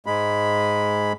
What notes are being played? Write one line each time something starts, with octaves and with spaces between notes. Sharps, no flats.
G#2 G#3 B5